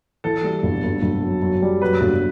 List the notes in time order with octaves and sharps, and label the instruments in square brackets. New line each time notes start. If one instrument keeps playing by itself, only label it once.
[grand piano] E3 [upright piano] A4
[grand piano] G3
G1
G1
G1
F#2
F#2
G3
[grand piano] F#2 [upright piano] B4
[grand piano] G1